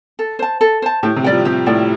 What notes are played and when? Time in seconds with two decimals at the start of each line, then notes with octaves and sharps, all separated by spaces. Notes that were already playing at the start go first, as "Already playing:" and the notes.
0.19 A4
0.39 C5 A5
0.61 A4
0.82 C5 A5
1.03 A2 G4
1.16 C3
1.24 G3 D5 G5
1.31 F3
1.45 C3 G4
1.66 A2 D5 G5